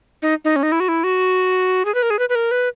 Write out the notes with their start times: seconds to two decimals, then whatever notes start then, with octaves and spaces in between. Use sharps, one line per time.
0.22 D#4
0.45 D#4
0.56 C#4
0.63 D#4
0.72 E4
0.80 F#4
0.88 E4
1.04 F#4
1.85 G#4
1.95 B4
2.03 A#4
2.10 G#4
2.19 B4
2.29 B4
2.35 A#4
2.51 B4